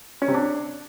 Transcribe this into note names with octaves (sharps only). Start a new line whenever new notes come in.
C#4
C3
D4